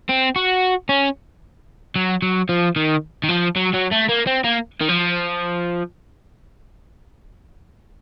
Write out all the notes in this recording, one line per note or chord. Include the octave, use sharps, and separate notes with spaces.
C4
F#4
C#4
F#3
F#3
F3
D#3
D#3
F3
F#3
F#3
A3
A#3
C4
A#3
D#3
F3